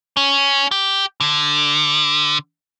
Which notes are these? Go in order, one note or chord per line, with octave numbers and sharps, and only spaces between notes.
C#4
G4
D3